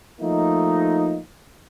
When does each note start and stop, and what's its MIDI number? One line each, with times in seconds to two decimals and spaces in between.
0.21 1.18 53
0.21 1.18 57
0.21 1.18 58
0.21 1.18 63